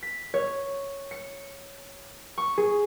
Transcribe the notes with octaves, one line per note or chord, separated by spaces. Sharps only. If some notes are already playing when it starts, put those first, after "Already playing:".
B6
C#5
C#7
C#6
G#4